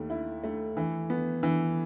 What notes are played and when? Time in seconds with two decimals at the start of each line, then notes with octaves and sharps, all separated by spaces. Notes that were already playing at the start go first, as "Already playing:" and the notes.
Already playing: D#2 A3
0.10 E4
0.44 A3
0.77 E3
1.10 B3
1.43 E3